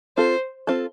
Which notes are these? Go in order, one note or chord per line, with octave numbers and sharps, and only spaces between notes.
C4 F4 A4 C5
C4 F4 A4